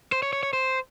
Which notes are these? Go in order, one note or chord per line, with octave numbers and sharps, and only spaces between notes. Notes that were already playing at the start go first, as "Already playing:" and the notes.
C5
C#5
C#5
C#5
C5